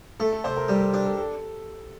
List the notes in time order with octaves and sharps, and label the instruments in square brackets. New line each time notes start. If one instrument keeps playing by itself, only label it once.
[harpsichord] A3 [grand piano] A4
[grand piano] A4
[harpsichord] C3 [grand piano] C5
[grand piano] A#4
[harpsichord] G3 [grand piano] G4
[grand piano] A4
[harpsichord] D4 [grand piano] G4
[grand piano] A4
A4